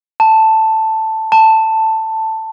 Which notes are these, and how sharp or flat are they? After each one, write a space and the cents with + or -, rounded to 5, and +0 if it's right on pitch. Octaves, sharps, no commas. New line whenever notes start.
A5 +5
A5 +10